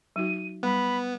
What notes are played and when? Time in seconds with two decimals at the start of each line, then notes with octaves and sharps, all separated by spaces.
0.16 F#3 D#4 F#4 D#7
0.63 G3 B3 B5